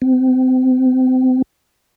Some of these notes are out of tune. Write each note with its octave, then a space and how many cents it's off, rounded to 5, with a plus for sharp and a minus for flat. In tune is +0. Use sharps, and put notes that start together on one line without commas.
C4 -30